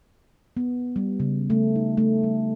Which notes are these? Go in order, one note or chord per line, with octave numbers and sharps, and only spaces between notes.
B3
G3
C#3
A3
D#4
A3
G3